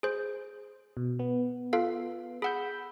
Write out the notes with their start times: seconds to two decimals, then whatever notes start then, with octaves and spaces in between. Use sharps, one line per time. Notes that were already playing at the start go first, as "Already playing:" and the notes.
0.03 G#4 C5
0.97 B2
1.19 B3
1.73 F4 A4 F5
2.42 G#4 F#5 B5 E6 G6